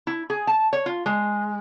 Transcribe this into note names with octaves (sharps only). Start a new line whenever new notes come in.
E4
G#4
A5
C#5
F4
G#3